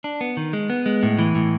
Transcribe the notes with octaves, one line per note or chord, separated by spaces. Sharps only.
D4
B3
D#3
G#3
B3
G#3
A2
E3
A2